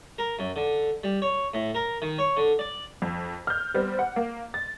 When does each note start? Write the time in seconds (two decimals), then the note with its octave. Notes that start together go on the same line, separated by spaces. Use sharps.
0.18 A#4
0.39 F#2
0.56 D3
1.04 G3
1.22 C#5
1.54 A2
1.75 A#4
2.02 D#3
2.19 C#5
2.37 D3
2.59 D5
3.02 F2
3.47 F6 G6
3.74 G3 B3 C4
3.99 F#5
4.16 A#3
4.54 A6